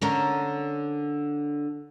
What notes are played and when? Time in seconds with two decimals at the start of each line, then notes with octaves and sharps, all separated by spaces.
0.02 D3 C#4 A#4